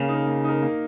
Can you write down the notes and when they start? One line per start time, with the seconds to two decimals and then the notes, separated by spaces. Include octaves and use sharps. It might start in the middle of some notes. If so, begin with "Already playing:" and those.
Already playing: C#3 A#3
0.09 D#4 A#4
0.27 A#3
0.44 D#4 A#4
0.62 A#3